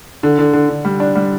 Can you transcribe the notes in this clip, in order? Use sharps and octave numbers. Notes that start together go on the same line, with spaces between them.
D3
D3
D3
D3
G3
D4
G3